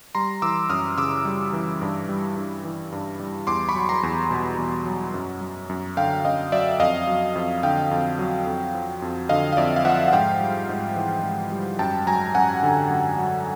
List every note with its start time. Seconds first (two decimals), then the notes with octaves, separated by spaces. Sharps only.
0.15 G3 A#5 C6
0.42 E3 D6 E6
0.70 F#2 D#6 F6
0.97 C#3 D6 E6
1.25 G3
1.53 E3
1.82 G2
2.09 G3
2.37 G2
2.64 E3
2.92 G2
3.19 G3
3.47 E2 C6 D6
3.69 B5 C#6
3.75 F#3
3.89 A#5 C6
4.03 E2
4.31 B2
4.58 E2
4.86 F#3
5.14 F#2
5.41 F#3
5.69 F#2
5.97 D3 F5 G5
6.24 F#2 D#5 F5
6.52 F#3 D5 E5
6.80 F2 D#5 F5
7.07 F#3
7.35 F2
7.63 D3 F5 G5
7.91 F2
8.19 F#3
8.47 F2
8.74 F3
9.02 F2
9.29 D3 D#5 F5
9.53 F5
9.57 F2 D5 E5
9.76 F5
9.85 F3 E5 F#5
10.08 F#5
10.13 G#2 F5 G5
10.41 G3
10.69 G#2
10.96 E3
11.23 G#2
11.52 G3
11.79 F#2 G5 A5
12.07 F#3 G#5 A#5
12.35 F#2 F#5 G#5
12.63 D3
12.90 F#2
13.19 F#3